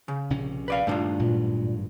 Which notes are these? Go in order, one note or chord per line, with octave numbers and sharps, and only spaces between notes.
C#3
A#1 C3 C#4
B4 D5 F5
G2 A#2 D#3 A3 D4 F4
G#1 G2 A#2 F#3